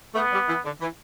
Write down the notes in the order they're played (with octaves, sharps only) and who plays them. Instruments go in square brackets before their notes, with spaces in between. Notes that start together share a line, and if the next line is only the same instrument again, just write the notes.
[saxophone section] A3 [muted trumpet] B3
[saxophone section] G3
E3
D3
E3